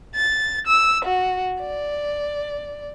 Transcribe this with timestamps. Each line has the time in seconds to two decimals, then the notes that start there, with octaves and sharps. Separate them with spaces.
0.15 A6
0.67 E6
1.05 F#4
1.61 D5